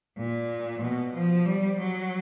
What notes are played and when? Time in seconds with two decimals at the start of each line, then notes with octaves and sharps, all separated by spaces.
0.16 A#2
0.81 B2
1.14 F3
1.46 G3
1.79 F#3